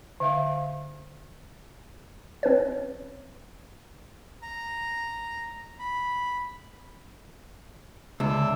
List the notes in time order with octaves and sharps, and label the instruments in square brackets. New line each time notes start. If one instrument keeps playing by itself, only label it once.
[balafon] D3 E5 F5
[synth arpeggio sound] C4 C#4 B4 C#5
[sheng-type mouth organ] A#5
B5
[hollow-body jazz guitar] C#2 [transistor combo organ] D3 E5